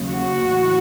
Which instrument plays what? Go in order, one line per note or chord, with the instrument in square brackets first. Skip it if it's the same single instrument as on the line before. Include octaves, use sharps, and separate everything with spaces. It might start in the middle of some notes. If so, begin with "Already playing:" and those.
Already playing: [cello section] D#2 C#3 F#3
F#4
A2 E3